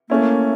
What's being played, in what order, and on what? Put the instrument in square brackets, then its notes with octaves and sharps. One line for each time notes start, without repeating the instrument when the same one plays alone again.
[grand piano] A3 C#4 E4 [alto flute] A#3